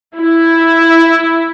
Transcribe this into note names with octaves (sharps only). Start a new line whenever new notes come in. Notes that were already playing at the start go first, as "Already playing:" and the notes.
E4